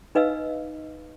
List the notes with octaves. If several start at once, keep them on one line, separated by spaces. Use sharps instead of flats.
D#4 B4 D#5 F5 E6